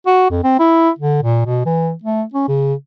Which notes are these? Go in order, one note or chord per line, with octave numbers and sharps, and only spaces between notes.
F#4
F2
C4
E4
D3
A#2
B2
E3
A3
C#4
C#3